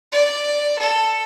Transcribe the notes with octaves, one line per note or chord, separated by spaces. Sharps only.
D5
A4